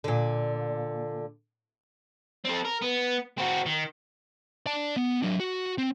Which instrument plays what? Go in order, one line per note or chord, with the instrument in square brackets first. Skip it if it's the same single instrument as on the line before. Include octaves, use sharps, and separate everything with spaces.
[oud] A#2 D3
[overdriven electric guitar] C4 A4
A#4
B3
C4 F#4
D#3
[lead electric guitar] D5 A5
B3
F#3 D4
F#4
C4